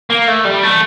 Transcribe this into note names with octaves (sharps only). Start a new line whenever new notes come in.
A#3
A3
G3
A3